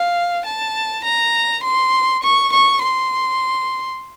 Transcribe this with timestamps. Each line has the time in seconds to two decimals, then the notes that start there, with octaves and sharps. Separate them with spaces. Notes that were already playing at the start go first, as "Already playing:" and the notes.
Already playing: F5
0.45 A5
1.04 A#5
1.63 C6
2.23 C#6
2.52 C#6
2.82 C6